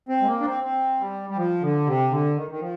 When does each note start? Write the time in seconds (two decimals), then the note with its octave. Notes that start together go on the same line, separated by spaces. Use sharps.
0.09 C4
0.22 G#3
0.27 A#3
0.40 D4
0.46 C4
0.64 C4
1.01 G3
1.30 G3
1.37 F3
1.62 D3
1.87 C3
2.11 D3
2.36 D#3
2.51 D#3
2.61 F3